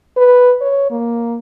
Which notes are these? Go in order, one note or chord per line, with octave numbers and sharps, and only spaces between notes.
B4
C#5
A#3